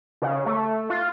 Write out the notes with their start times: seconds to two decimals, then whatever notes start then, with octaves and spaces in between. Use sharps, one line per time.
0.22 C#3
0.46 A3
0.90 F4